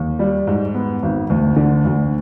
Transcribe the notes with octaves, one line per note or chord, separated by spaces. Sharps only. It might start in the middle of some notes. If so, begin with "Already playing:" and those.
Already playing: D#2
G3
G#2
B3
G#1
D2
D3
D2